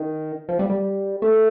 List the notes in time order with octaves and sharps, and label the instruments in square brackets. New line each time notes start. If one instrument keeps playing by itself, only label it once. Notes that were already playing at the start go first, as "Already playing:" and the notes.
Already playing: [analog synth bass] D#3
F3
G3
G3
A3